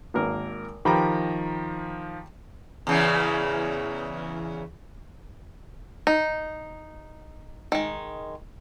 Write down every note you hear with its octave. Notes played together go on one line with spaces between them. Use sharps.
G#1 A#3 A#4
D#3 F3 G4 G5 A#5 B5
E2 C#3 E3
D#4
D#3 G#3